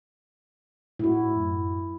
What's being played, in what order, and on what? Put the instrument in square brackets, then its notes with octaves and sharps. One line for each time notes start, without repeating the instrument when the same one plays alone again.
[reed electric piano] A2 [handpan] E4 F#4
[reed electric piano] F#2